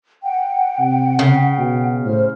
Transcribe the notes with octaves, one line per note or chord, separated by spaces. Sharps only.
F#5 G5
C3
C#3
B2
A2 C5 F6